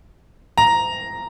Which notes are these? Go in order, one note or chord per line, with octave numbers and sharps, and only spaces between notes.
A#5